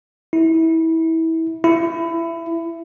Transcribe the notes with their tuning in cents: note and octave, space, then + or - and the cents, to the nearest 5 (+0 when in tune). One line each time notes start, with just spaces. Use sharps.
E4 -25
E4 +20